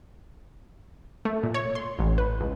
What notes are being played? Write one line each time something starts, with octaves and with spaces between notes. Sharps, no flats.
A3
A#2
C#5
C6
A1
B4
C#2